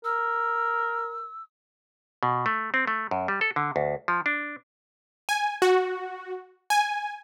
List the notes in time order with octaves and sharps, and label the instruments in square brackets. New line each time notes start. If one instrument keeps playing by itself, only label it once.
[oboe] A#4 [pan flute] E6
[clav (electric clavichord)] B2
A3
C4
A3
F#2
G3
A4
D3
D2
F3
D4
[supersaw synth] G#5
F#4
G#5